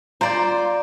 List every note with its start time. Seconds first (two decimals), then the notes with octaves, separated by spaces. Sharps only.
0.21 F4 C5 D5 A#5 C6